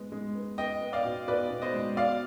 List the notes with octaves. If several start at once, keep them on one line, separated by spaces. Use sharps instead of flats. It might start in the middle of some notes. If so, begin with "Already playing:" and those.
Already playing: G#3 B3
G#3
B3
B3 D#5 G5
B3
D5 F5
B2
B2 B4 D5
B2
C5 D#5
G#3
B2 D5 F5